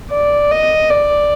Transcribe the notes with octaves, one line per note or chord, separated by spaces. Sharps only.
D5
D#5
D5